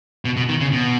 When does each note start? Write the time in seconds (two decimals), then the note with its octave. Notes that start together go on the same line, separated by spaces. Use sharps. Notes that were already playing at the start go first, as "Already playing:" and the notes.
0.25 B2
0.37 B2
0.49 D#3
0.61 C#3
0.73 B2